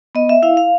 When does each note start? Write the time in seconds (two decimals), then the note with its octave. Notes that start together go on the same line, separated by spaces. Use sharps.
0.15 B3 D#5
0.29 E5
0.43 E4 F5
0.57 F5